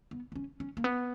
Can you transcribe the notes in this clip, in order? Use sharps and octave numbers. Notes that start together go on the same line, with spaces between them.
B3
B3
C#4
C#4
A#3
B3